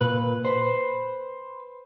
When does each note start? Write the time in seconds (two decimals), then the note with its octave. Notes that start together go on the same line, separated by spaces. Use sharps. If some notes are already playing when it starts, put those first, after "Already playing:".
0.01 A#2 B4
0.45 B4 C5